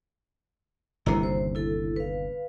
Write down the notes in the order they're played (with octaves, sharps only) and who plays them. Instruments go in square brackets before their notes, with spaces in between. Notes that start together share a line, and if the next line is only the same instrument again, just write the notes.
[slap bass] G1 D#2 C3 [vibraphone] E4 A#5
[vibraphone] C5
E4 A4
B4 F5